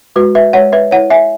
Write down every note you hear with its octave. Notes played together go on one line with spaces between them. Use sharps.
G#3 F#4 B4
B4 E5
G#3 C#5 F#5
B4 E5
E4 C#5 F#5
E5 G#5